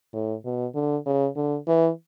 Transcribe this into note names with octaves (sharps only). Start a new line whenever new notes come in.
A2
B2
D3
C#3
D3
E3